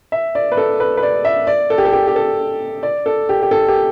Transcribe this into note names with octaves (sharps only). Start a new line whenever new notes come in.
E5
D5
B4
A4
B4
B4
D5
E5
D5
A4
G4
A4
G4
G4
A4
D5
A4
G4
G4
A4
G4